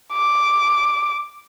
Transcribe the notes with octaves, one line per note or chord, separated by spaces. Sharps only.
D6